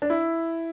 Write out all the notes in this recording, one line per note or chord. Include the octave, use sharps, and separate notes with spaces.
D4
E4